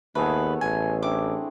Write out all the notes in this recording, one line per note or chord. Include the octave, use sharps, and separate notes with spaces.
D#2 A3 B3 G#4 B4
A1 G#5
C4 D4 E4 D6